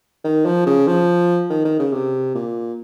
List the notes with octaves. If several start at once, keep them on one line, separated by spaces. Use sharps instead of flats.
D#3
F3
C#3
F3
D#3
D#3
C#3
C3
A#2